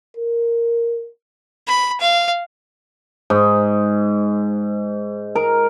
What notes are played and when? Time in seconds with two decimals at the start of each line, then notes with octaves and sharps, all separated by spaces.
0.17 A#4
1.67 B5
2.00 F5
3.30 G#2
5.35 A#4